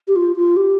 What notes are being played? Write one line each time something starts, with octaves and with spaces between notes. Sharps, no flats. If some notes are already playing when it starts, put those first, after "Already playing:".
G4
F4
F4
G4